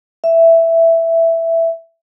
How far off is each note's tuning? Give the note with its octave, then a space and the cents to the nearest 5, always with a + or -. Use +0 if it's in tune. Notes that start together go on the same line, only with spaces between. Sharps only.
E5 +5